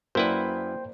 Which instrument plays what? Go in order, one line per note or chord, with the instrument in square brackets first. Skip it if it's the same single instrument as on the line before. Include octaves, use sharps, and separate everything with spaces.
[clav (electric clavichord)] F#2 E4 B4 [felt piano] A#3 D5 [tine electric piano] C5 G5